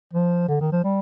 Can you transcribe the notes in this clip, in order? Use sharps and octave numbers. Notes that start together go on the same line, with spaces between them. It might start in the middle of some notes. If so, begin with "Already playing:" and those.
F3
D3
D#3
F3
G3